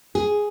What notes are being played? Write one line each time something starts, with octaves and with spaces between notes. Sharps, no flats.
G#4